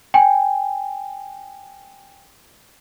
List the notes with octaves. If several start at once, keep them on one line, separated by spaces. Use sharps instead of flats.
G5 G#5